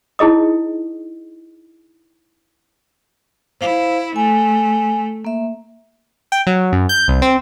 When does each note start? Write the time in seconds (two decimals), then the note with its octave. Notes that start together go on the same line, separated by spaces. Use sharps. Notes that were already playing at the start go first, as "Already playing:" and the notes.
0.19 D#4 E4 G#4 D#5 D#6
3.61 E4 C5 F5
4.16 A3 G#5
5.25 A#3 E5
6.32 G5
6.47 F#3
6.73 F#2
6.89 G6
7.08 C2
7.22 C4